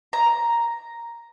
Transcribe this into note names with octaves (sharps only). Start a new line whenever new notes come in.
A#5